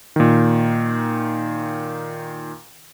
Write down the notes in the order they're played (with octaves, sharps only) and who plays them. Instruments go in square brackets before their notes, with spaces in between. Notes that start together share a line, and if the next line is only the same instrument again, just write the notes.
[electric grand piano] A#2 D#3